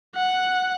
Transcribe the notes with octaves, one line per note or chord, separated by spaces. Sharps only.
F#5